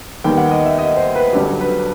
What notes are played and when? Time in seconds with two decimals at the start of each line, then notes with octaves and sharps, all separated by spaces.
0.24 D#2 D#3 G3 B3 G5
0.37 F#5
0.51 D#5
0.66 E5
0.79 D#5
0.97 C5
1.15 B4
1.33 G1 G2 F#3 G4
1.61 B4